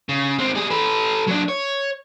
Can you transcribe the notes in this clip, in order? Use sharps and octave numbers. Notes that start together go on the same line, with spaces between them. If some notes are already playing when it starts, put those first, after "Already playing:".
C#3
G#3 C4
G3 G#4
A4 B4
F#3 D4
C#5